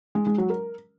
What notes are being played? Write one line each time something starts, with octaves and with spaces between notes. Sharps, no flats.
G#3
G#3
F#3
A#4